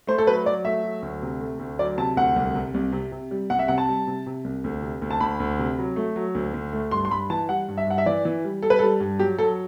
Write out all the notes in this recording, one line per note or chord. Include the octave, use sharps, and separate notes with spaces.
A3 C5
A4
F#3 B4
F#3 D5
A3 E5
F#3
D2
C3
A3
D2
F#3 D5
C3 A5
D2 F#5
C2
C3
C2
C3
C3
G3
C2 F#5
E5
C3 F#5
A5
G3
C3
C3
C2
D2
C3
D2
A5
D2 B5
D2
C3
F#3
A3
F#3
D2
D2
A3
G2 C6
C6
G2 B5
E3 A5
G3 F#5
G2
E5
G2 F#5
E5
E3 D5
E3
G3
G3 A4
B4
G3 A4
G2
F#3 G4
F#3 A4